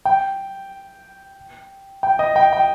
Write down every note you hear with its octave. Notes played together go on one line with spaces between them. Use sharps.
G5
G5
D#5
G5
G5